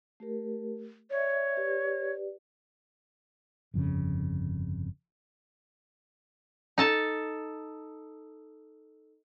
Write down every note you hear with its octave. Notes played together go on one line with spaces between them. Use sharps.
A3 G4 A#4
C#5 D5 E5
G4 B4 D5
G1 F2 C#3
D#4 A4 A5